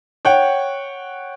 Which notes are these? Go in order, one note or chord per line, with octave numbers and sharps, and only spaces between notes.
C#5 F#5 G5